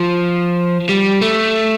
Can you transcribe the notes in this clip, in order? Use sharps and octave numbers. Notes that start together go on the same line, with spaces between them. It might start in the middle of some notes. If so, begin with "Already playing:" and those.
Already playing: F3
G3
A3